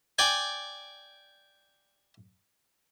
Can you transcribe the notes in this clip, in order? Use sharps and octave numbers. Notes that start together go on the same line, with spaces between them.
D5 G5 G#5